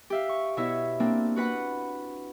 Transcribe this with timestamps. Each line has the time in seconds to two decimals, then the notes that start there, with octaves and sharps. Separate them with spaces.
0.10 G4 E5 F5
0.29 C#6
0.57 B2 E4 C#5 E5
1.00 A#3 C4 D4
1.36 F#4 B4 F#5 B5